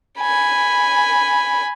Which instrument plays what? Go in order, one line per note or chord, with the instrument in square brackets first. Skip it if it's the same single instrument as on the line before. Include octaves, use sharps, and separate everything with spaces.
[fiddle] G#5 B5